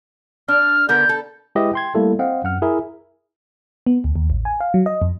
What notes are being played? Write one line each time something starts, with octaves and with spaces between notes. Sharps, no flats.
D4 F6
D3 B3 A#4 G6
A4
G#3 E4 G4 B4 D#5 E5
G5 C6 G#6
G3 A3 A#3 E4 A4
C4 D#5 F5 F#5
F#2 F#5 F6
E4 G#4 A#4 E5
B3
D2
D#2
A1
G#5
F5
F#3
D#5
F2